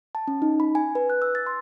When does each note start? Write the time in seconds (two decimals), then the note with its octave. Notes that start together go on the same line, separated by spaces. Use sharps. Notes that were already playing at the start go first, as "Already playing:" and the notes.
0.15 A5
0.28 C#4
0.42 D#4
0.60 B5
0.75 G#5
0.95 B4
1.10 F#6
1.22 E6
1.35 A6
1.47 C6